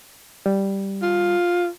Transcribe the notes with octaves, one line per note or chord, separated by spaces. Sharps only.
G3
F4